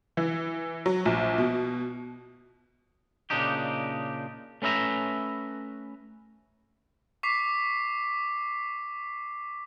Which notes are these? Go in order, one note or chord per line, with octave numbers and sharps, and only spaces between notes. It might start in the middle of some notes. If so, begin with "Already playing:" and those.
E3
F#3
A#1
B2
A#2 C#3 D4 D#4 G4
A3 C#4 B4 E5 A#5
C#6 D6 B6 C7